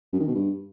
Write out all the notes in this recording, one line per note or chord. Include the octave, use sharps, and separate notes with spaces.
F#2
D#3
B2
G2